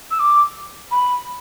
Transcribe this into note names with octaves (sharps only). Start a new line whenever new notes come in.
E6
D6
B5